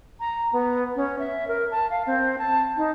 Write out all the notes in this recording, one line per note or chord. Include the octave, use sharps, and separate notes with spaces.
A#5
B3
C#4
E5
A#4
A5
F5
C4
A5
D#4